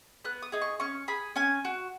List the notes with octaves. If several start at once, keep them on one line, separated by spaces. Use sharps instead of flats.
B3 F#6
D#6
D#4 G#4
C#6
C#4 C#6
G#4 B5
C#4 G#5
F#4